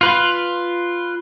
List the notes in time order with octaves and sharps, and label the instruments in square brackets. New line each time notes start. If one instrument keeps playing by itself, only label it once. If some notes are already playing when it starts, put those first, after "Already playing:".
[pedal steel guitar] F4 B4